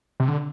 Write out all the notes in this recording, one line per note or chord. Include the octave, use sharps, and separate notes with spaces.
C3
D3